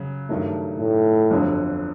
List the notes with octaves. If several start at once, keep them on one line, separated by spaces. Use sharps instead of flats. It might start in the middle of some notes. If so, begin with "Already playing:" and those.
Already playing: C#3 F#3
G2 D#3 F#3 A3
A2
G1 F2 D3 F#3